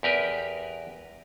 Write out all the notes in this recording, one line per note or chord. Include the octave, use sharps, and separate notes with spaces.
E2 G4 A#4 B4